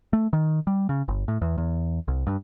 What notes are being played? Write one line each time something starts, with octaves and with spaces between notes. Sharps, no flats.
A3
D#3
G3
C#3
G1
A2
E2
E2
C2
G2